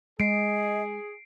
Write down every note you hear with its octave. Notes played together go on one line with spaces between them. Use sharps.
G#3 G#4 D#5 C7 D7